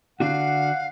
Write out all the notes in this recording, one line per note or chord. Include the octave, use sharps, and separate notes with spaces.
D3 D4 F#4 F5 F#5